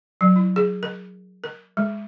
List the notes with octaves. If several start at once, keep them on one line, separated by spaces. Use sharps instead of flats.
F#3
E4
G#4
A#4
A#4
G#3